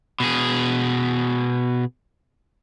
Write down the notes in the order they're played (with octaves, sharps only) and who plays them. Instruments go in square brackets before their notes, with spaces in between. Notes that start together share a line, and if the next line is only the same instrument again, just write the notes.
[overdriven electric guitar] B2 G#4